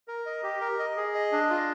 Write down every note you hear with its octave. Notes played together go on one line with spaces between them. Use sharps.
A#4
D#5
G4
A#4
D#5
G#4
D#5
D4
F4